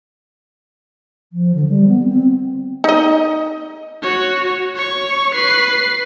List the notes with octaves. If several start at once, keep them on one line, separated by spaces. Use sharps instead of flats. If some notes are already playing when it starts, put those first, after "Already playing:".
F3
D3
G3
B3
C4
D#4 D#5
F#4 C#5
C#5 C#6
B4 C7